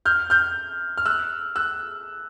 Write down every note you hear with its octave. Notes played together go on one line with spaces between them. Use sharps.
F6 G6
F6 G6
F6
E6 F#6
E6 F#6